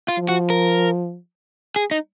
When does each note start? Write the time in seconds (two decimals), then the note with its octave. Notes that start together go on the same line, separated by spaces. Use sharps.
0.08 F4
0.18 F3
0.29 F#4
0.50 A#4
1.76 G#4
1.91 D#4